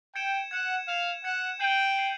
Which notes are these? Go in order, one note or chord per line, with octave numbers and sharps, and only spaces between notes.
G5 G#6 C#7 E7
F#5 G#6 C#7 E7
F5 G#6 C#7 E7
F#5 G#6 C#7 E7
G5 G6 C7 D#7 F#7
G6 C7 D#7 F#7